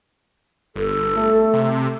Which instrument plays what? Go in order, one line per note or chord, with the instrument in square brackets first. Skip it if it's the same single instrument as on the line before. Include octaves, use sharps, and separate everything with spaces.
[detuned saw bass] G1 [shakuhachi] A4
[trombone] A3
[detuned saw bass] C3